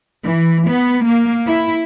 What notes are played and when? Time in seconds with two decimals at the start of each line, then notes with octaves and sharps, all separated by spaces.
0.24 E3
0.67 B3
1.06 A#3
1.47 E4